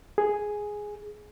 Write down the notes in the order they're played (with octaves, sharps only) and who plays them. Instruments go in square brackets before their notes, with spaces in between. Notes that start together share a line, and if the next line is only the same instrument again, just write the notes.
[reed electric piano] G#4